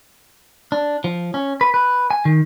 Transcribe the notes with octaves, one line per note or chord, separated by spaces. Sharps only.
D4
F3
C#4
B4
B4
G#5
D#3